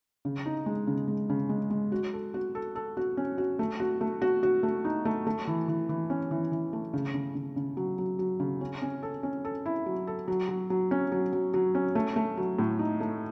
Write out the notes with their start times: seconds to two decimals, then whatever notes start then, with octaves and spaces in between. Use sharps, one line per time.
0.25 C#3
0.46 D#4
0.66 G#3
0.87 C#3
1.08 G#3
1.30 C#3
1.49 G#3
1.71 G#3
1.92 F#4
2.13 A4
2.34 F#4
2.55 A4
2.75 A4
2.97 F#4
3.17 C#4
3.38 F#4
3.59 A3
3.80 F#4
4.01 A3
4.22 F#4
4.43 F#4
4.63 A3
4.85 D#4
5.05 A3
5.27 A3
5.47 E3
5.68 E3
5.89 E3
6.10 C#4
6.31 E3
6.52 E3
6.73 A3
6.93 C#3
7.14 C#3
7.35 C#3
7.56 C#3
7.77 F#3
7.99 F#3
8.19 F#3
8.40 C#3
8.61 C#4
8.82 C#4
9.03 A4
9.23 C#4
9.45 A4
9.66 E4
9.86 F#3
10.07 A4
10.28 F#3
10.49 F#3
10.70 F#3
10.91 C#4
11.12 F#3
11.33 F#3
11.54 F#3
11.75 C#4
11.95 A3
12.16 A3
12.37 F#3
12.59 A2
12.79 D#4
13.00 A3